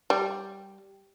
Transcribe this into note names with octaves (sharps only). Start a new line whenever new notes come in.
G3